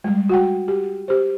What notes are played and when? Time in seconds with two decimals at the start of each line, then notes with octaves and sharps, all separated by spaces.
0.04 G3 G#3
0.29 F#4 F#5 G5
0.68 G4
1.08 G4 C5